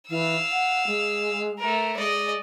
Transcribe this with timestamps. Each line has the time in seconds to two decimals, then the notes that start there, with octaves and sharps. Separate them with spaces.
0.10 E3 F5 E6
0.51 F#5
0.87 G#3
1.58 A3 A#4
1.96 G#3 D5 D#5